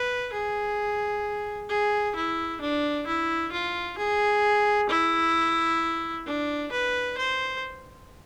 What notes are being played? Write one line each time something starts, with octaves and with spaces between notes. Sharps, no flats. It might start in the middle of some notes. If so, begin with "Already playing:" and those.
Already playing: B4
G#4
G#4
E4
D4
E4
F4
G#4
E4
D4
B4
C5